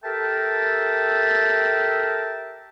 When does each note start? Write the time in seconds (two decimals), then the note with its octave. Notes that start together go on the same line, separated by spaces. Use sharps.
0.04 G4 A4 A#4 E5 G5 A5